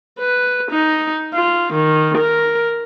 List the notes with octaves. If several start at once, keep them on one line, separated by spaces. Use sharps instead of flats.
B4
D#4
F4
D#3
A#4